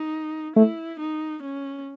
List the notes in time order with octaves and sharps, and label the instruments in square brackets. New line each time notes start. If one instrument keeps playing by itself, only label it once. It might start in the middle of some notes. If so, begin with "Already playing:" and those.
Already playing: [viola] D#4
[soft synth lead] A3 [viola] E4
[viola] D#4
C#4